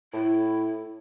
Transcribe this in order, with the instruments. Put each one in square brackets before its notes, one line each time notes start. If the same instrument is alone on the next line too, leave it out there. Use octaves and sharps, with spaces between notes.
[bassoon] A2 [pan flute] E4